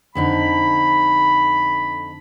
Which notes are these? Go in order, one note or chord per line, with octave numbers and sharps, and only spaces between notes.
F2 D3 D#4 B5